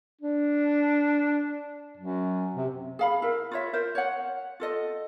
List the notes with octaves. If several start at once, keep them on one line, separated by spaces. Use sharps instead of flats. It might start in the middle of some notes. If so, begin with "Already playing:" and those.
D4
F#2
C3
G#4 F5 B5
E4 A#4
F4 C#5 E5
A#4 C5 E5
C#5 F#5
F4 A4 D#5